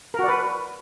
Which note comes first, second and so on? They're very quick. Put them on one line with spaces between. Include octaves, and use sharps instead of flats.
A#4 F#4 D5 B4